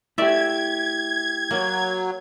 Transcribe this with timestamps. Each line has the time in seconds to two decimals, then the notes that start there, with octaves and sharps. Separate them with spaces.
0.18 A3 E4 G4 D5 E5 G#6
1.51 F#3 A#3